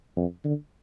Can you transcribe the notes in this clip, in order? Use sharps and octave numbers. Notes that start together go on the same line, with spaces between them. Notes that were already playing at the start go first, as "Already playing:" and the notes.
F2
D3